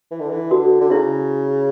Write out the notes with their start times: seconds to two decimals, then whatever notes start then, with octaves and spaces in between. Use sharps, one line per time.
0.11 E3
0.20 D3
0.30 E3
0.51 D3 F#4
0.81 D3
0.91 C#3 E4